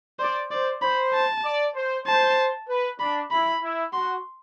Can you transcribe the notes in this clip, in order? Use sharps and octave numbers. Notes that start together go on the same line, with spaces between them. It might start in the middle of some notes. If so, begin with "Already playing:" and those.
C5 D5
C5 D5
C5 B5
A5
D5
C5
C5 A5
B4
D4 B5
E4 B5
E4
F#4 C6